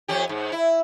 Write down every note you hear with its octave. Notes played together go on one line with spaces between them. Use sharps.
F2 C#4 G4
G#2
E4